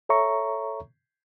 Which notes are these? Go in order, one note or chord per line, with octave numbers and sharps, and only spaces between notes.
A4 C#5 E5 A#5 C#6